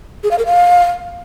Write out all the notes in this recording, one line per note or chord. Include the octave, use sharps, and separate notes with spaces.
G#4
F5
A#4
F5